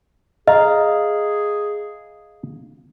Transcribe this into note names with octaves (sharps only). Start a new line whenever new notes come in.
G#4 D#5 F5 A#5